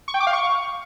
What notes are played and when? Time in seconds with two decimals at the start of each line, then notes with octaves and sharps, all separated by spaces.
0.08 C#6
0.14 G5
0.20 D6
0.27 F5
0.33 C#6